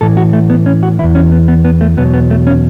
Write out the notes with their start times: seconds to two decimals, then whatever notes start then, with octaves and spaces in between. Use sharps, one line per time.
0.01 A2 E3 A4
0.17 F#4
0.33 A3
0.50 B3
0.66 C#4
0.83 F#4
0.99 E2 E3 E4
1.15 C#4
1.32 B3
1.48 B3
1.65 B3
1.81 A3
1.97 E2 B2 F#3 B3
2.14 B3
2.30 A3
2.47 C#4